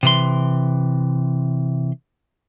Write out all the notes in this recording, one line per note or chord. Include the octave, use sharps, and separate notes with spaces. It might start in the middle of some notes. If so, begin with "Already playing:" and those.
C3 E3 C6